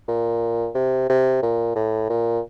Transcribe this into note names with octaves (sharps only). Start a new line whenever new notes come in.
A#2
C3
C3
A#2
A2
A#2